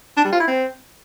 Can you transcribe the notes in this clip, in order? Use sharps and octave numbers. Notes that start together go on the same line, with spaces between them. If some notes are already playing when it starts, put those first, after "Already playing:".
D4
G3
F4
E4
C4